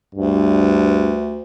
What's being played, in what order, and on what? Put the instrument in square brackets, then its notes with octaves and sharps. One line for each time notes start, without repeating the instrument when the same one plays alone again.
[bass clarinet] D2 [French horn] G2